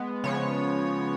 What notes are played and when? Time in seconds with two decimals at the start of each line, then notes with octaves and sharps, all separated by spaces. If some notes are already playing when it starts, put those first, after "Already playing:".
Already playing: G#3 B3
0.24 C#3 F3 G#3 B3 C#5